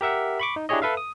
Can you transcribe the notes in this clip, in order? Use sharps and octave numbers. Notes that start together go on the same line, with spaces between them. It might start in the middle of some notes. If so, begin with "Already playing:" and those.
G4 A#4 E5 F#5
B5 C#6 D6
D#4
D4 E4 G4 G#4 C#5 D#5
A4 B4 E5 F5
D#6